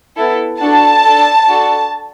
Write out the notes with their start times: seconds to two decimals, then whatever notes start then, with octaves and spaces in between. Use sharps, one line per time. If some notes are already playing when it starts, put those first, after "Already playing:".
0.16 B3 E4 A4
0.61 D4 F#4 A4 A5
1.04 D4 A4
1.48 D4 F#4 A4